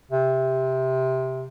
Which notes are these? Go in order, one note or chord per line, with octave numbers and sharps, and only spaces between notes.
C3